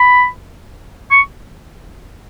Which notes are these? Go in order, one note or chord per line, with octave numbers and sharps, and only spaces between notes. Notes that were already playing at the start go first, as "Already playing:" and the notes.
Already playing: B5
C#6